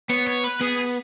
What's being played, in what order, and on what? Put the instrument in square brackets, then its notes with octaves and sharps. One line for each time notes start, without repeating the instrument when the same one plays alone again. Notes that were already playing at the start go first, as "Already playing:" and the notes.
[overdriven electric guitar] B3 [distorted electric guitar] C#5
[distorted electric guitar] C#5
B4
[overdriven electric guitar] B3 [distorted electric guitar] G#4